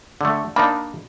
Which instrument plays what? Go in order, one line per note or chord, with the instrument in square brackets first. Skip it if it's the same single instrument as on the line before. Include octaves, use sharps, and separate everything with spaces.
[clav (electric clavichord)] D3 A3
[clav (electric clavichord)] A#3 D4 D#4 [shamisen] B5